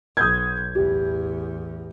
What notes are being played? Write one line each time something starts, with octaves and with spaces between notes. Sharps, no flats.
B1 D#6 G6 G#6
A1 E2 G4